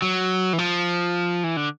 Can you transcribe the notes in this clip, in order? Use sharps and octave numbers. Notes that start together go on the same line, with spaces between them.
F#3
E3
F3
E3
D3